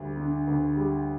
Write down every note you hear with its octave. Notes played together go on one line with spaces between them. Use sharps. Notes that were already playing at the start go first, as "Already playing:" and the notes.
Already playing: D2 G3
D3
D2
G3